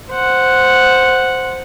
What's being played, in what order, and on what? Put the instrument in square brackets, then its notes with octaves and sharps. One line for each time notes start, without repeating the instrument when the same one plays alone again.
[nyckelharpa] C5 F#5